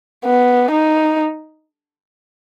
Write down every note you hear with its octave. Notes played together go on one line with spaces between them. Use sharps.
B3
D#4